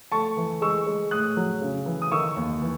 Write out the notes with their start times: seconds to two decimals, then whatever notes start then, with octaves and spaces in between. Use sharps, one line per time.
0.12 A3 A5 C#6
0.37 E3
0.62 G#3 C#6 E6
0.87 G#3
1.11 A2 D#6 F#6
1.37 F#3
1.62 C#3
1.86 E3
2.02 D#6
2.12 D#3 C#6 E6
2.36 D#2
2.62 E3